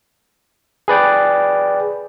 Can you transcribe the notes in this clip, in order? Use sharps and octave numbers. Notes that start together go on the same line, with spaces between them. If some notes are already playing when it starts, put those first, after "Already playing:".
G#4 B4 D5 G5